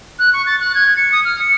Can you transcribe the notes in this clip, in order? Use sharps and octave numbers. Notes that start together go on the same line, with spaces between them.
F#6
C#6
A6
F#6
G#6
C#7
D#6
F6
C#7